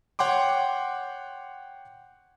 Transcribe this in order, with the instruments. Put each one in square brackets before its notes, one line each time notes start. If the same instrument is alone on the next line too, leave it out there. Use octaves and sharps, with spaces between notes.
[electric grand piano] C#5 F#5 G5 C6 D6